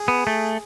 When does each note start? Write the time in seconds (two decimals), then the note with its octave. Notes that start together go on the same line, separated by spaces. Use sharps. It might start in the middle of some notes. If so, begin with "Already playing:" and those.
Already playing: G#4
0.08 B3
0.27 A3